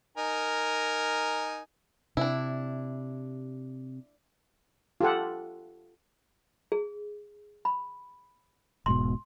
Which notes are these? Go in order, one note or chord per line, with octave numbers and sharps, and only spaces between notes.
D#4 A#4 G#5
C3 D4 E4
F4 G4 A4 F#5
G#4
B5
E1 G#2 B2 C6